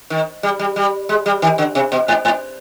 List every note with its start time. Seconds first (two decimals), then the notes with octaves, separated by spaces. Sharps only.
0.10 D#3
0.43 G3
0.59 G3
0.76 G3
1.09 G#3
1.26 G3
1.42 D#3
1.58 D3
1.75 C3
1.92 B2
2.08 G#2
2.25 G#2